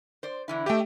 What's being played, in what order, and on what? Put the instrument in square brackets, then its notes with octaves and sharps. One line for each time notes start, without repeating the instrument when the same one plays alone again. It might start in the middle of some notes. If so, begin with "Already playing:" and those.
[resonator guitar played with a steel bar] C5 D5
D3 E3 E4
[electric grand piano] A3 G4 [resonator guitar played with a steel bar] D#5 E5 G5